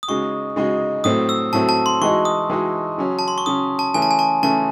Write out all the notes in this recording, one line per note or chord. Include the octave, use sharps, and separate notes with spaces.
D#6
C#3 G#3 D#4 F#4 C#6
C#3 G#3 D#4 F#4
A2 F#3 A3 C4 D#6
E6
A2 F#3 A3 C4 A5
A5
C6
E3 G#3 D#4 F#4 C#6
D#6
E3 G#3 D#4 F#4
C#3 F#3 C#4
A5
C6
C#6
C#3 F#3 C#4 D#6
A5
C#3 E3 A3 C#4 G#5
A5
G#5
A5
C#3 E3 A3 C#4 A5